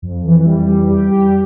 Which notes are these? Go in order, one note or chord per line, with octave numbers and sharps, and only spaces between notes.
F2
E3
G3
G3
G4
G4